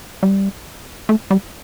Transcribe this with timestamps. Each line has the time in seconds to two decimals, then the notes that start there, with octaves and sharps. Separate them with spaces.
0.23 G3
1.09 A3
1.31 G3